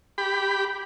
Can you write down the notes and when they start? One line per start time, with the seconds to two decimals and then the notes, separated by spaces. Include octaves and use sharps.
0.18 G4 B5